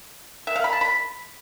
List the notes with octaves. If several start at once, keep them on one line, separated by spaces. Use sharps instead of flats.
E5
F5
B5
A5
B5